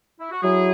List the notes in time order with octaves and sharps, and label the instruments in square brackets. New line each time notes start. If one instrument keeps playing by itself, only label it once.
[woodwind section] E4
F#4
[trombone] F#3 [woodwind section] E4 G#4